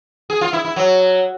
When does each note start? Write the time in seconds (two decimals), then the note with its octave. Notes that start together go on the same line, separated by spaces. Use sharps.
0.30 G#4
0.41 F4
0.53 E4
0.65 E4
0.76 F#3